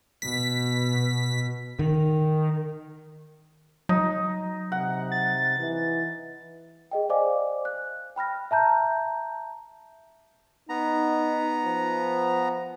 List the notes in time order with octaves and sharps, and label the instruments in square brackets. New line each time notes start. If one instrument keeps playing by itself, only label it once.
[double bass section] B2 [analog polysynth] B6
[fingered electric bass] D#3
[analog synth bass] F#3 [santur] D#4
[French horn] C3 [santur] F#5
[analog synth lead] A6
[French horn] E3
[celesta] G#4 D#5 G5
C5 D5 D#5 F5 G#5 D6
F#6
G5 B5 F6 A#6
E5 A5 A#5 G6
[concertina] B3 A#5 [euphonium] D#4
[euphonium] F3